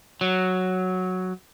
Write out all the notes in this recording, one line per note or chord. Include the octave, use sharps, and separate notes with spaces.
F#3